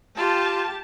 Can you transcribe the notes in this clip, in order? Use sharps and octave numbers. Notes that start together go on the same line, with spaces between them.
F4 G4 A5